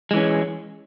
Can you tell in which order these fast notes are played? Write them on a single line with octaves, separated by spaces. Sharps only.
G#3 E3 C#4